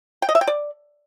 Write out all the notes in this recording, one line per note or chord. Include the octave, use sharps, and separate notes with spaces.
G5
D#5
E5
G5
D5